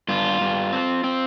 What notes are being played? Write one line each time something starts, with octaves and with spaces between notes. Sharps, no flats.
G2 F4
G2
C4
C4